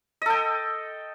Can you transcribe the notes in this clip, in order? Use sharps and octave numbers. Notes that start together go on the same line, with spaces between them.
A4 D#5 G5